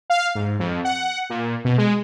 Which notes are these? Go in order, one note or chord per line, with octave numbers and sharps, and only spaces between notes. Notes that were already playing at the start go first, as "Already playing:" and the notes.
F5
G#2
F2
F#5
A#2
B2
G#3